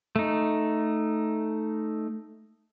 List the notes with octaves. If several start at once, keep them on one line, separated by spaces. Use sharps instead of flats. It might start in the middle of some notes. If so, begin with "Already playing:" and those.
A3 D#4